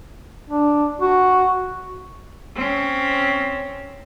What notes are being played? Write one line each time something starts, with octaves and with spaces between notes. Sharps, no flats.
D4
F#4
C4 C#4